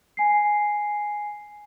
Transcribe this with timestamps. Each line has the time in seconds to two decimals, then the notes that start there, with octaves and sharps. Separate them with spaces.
0.17 G#5 C7